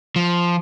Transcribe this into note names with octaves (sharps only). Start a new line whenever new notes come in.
F3